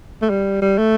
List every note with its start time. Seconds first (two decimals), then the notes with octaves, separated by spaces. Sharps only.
0.22 A3
0.29 G3
0.62 G3
0.78 A3